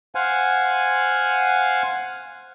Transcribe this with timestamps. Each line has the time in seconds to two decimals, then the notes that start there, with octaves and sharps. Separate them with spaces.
0.15 C5 F5 F#5 G#5